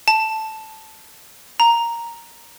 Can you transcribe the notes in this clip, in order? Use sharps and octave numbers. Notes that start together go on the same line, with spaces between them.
A5
A#5